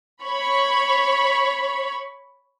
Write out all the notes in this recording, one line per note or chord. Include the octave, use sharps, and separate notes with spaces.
C#5 B5 C#6